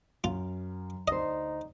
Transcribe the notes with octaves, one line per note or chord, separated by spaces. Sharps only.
F#2 F4
D2 D#4 C5 D5 D#5